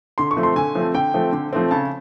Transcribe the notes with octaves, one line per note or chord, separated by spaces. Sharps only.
D3 C6
C#6
F3 A3 C4
C6
D3 G#5
F3 A3 C4
D3 G5
F3 A3 C4
D3
F3 A3 C4
C#3 A5